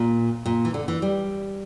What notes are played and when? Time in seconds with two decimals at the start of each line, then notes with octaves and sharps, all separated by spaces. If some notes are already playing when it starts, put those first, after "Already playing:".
Already playing: A#2
0.46 A#2
0.65 E3
0.74 D3
0.88 E3
1.02 G3